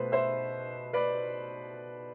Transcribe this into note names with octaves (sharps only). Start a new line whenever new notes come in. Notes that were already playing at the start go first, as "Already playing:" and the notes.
Already playing: B2 A3 B4 C5
C5 E5
B4 D5